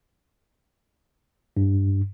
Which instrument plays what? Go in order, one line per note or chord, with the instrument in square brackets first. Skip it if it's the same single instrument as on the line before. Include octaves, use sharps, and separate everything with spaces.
[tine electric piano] G2